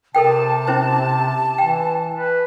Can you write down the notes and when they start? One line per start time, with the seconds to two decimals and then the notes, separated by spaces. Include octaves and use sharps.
0.15 C3 A4 A#4 G5 A5
0.67 C#4 E4 C5
1.58 E3 G5
2.13 B4